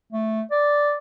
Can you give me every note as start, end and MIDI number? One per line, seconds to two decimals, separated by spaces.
0.12 0.42 57
0.51 0.96 74